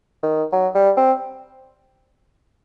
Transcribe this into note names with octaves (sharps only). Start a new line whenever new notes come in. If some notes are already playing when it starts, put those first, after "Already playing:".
D#3
F#3
G3
C4